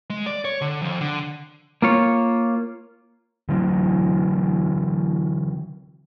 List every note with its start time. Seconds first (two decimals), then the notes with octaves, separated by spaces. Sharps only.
0.10 G#3
0.27 D5
0.45 C#5
0.61 D3
0.82 F2
1.01 D3
1.82 A#3 F4 C#5
3.49 D3 E3 F#3 C4